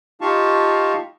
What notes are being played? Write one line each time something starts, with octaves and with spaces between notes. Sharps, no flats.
D#4 F4 G4 F5 A5 C#6